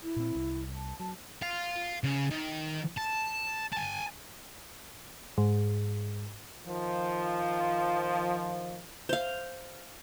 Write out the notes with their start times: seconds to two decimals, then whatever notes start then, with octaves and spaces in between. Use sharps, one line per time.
0.03 E4
0.16 A#2 C4
0.35 C2
0.75 A5
1.00 F#3 A5
1.42 F5 C6
2.04 C#3
2.30 D#3
2.97 A5
3.72 G#5 A5
5.38 G#2
6.67 D#3 F3
9.09 C5 F5